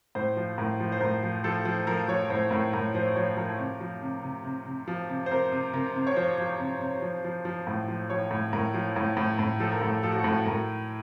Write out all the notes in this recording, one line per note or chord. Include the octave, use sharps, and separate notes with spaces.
A2 C5
F3
A2 A#4
F3
C5
A2 A#4
F3
F3 A4
F3
F3 A#4
F3 C#5
A2 C5
A2 A#4
A2 A#4
F3 C5
F3 C#5
F3 A#4
C3
F3
C3
C3
C3
C3
F3
C3
C5
C3 A#4
C3
C3 A#4
C3
C#5
F3 C5
F3
C3
C3
F3
F3
F3
A2
F3
F3 C#5
A2
A2 A#4
F3
A2
A2
A2
F3 A4
A#4
A2 A4
F3 A4
F#4
A4
A2
A2 A#4